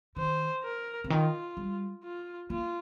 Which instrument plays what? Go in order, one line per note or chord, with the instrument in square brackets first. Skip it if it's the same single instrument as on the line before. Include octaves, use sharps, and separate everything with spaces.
[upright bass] D#3 [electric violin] C5
[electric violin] A#4
[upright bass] C3
[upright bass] D#3 [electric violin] F4
[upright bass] G3
[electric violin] F4
[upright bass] A#3 [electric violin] F4